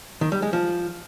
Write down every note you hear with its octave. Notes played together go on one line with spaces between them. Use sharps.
D#3
G3
G#3
F3